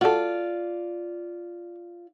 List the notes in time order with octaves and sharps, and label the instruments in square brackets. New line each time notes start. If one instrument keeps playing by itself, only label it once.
[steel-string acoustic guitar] F4 D5 [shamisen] F#4 A4